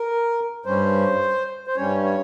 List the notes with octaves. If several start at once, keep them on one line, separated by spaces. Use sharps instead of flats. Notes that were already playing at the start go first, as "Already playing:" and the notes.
Already playing: A#4
G2 G3 C#4 C5
C5
G2 G3 C#4 C#5
C#5